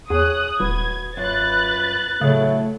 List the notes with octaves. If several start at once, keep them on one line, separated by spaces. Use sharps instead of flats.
E2 G#4 C#5 D#6 F#6
D#1 F#4 B4 G#6
F#2 F4 B4 F#6 A6
A2 C#3 F#3 A3